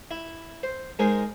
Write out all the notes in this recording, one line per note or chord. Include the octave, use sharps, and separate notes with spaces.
E4
C5
G#3 D#4 G#4 A#4 C5